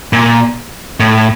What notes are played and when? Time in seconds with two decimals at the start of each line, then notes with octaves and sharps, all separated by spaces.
0.13 A#2
1.00 A2